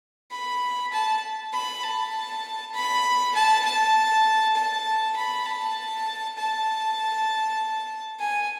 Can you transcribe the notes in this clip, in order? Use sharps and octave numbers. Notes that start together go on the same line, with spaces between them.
B5
A5
B5
A5
B5
A5
A5
A5
B5
A5
A5
G#5